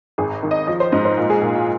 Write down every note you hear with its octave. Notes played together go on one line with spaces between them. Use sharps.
G#1 G#4
D#3
D#5
F3 D#5
C5
G#2 D#5
C5
A#2 F4
G#4
A#2 F4
F4